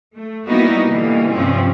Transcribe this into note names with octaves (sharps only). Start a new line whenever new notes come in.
A3
G3 A#3 B3 D#4 E4 F#4
B2 D3 E3 G3 A#3
G2 C3 F3 C4 C#4